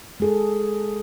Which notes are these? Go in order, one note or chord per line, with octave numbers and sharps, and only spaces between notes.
G#3 G#4 A4